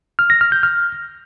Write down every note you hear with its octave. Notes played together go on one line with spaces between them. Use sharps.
F6
A#6
F6
G6
F6